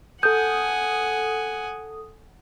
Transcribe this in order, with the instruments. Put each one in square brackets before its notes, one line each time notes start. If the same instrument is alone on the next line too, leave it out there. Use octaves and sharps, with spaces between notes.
[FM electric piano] A4 D#6 [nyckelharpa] F#5 G#5 [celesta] G6